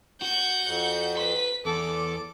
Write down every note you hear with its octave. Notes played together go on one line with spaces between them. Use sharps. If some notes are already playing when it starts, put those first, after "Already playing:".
F#4 F#5 G6
F2
B4 C6 B6
E2 A4 D6